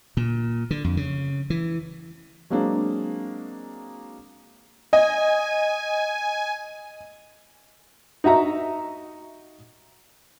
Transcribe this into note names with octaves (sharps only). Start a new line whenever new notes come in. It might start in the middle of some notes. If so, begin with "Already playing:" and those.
A#2
D3
F2
C#3
E3
F#3 G#3 A#3 C4 D4
D#5 G#5
D#4 F#4 E5 A#5